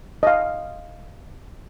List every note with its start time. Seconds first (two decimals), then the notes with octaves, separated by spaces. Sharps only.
0.23 D#5 F5